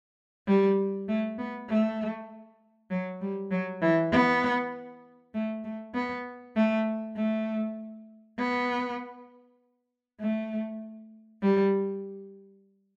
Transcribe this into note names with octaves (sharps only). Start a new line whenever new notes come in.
G3
A3
B3
A3
F#3
G3
F#3
E3
B3
A3
A3
B3
A3
A3
B3
A3
G3